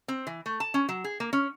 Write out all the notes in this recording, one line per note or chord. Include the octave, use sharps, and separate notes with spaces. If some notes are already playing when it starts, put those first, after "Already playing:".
C4
E3
A3
A5
C#4
F#3
G#4
A#3
C#4